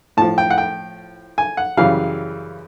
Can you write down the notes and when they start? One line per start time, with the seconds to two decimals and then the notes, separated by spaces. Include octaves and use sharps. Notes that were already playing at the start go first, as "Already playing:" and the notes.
0.17 A2 F3 A5
0.38 G5
0.50 F#5
0.58 G5
1.38 G#5
1.57 F#5
1.77 F#2 C#3 E3 G3 F5